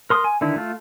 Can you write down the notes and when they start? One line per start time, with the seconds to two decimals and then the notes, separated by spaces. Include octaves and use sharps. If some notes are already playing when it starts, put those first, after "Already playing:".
0.10 A#4 C6 D#6
0.24 G#5
0.41 D3 D#3 E4
0.56 A3 F4